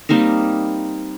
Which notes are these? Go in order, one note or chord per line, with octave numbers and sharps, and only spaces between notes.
G3 A#3 C4 D#4